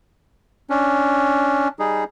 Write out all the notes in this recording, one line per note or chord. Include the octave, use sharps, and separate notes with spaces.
C#4 D4
G3 D#4 G#4